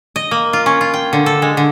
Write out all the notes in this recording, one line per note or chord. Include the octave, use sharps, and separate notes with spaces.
D#5
A#3
F4
C#4
F4
G5
D3
A4
G#3
D3